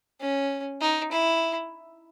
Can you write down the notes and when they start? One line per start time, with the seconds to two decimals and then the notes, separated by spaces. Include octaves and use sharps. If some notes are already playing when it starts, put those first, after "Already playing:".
0.21 C#4
0.81 D#4
1.12 E4